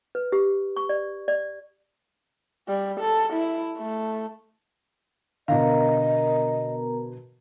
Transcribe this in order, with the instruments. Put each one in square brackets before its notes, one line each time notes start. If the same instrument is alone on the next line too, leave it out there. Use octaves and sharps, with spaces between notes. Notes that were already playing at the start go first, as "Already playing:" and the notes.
[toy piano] B4
G4
C#6
D5
D5
[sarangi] G3
A4
E4
A3
[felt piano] B2 D3 [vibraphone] B3 A#4 A#5 [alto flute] D#5 [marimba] F5